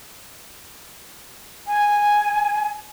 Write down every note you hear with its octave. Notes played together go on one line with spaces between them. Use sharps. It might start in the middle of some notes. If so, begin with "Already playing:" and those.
G#5